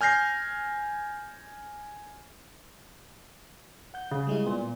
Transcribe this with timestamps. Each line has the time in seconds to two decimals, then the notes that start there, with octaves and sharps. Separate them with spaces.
0.01 G#5 F6 G6 A#6 C7
3.94 F#5 G6
4.11 C#3
4.27 G3 G#3 E4
4.46 A#2 B3